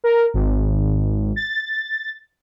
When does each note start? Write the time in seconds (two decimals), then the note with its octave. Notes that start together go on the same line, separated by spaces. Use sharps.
0.04 A#4
0.34 G#1
1.36 A6